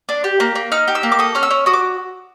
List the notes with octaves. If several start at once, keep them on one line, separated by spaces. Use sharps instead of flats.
D4
G4
A#3
A#3
D#4 F6
G4
E6
A#3
D6
A4 D#6
C#4 F6
E6
C#4
F#4 D#6
D6